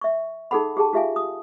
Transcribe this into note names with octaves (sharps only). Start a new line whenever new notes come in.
E5 C#6
D#4 G#4 A4 F#5 B5
G4 G#4 G5 A5
F4 G4 E5 F5 G#5
D#6